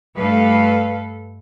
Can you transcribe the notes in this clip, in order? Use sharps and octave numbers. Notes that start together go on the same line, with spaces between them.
G2 A3 A4 B4 F5